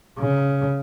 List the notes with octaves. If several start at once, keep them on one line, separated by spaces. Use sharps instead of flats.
C#3